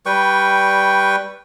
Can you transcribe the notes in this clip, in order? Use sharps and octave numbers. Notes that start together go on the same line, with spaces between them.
G3 B4 G5 C#6